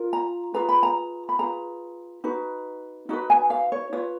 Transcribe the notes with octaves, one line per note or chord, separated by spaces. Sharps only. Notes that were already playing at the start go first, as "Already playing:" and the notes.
Already playing: F4 A#4
A#5
F4 G#4 B4 A#5
B5
A#5
B5
F4 G#4 B4 A#5
D#4 F#4 B4
D#4 F#4 B4
G#5
F5
C#5
F4 B4 C#5